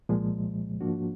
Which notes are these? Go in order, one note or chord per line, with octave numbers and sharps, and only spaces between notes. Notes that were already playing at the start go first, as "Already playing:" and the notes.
C2 A#2 F3 G#3
G#2 F3 A#3 D4 F#4